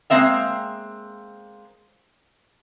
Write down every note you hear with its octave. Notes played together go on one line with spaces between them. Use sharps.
G#3 A#3 C4 E5 F5